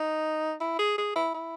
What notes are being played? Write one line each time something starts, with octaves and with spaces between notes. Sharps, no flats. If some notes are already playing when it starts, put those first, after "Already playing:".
Already playing: D#4
E4
G#4
G#4
E4
E4